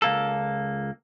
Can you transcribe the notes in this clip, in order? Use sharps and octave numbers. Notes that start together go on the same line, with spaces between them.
C#2 A#3 A4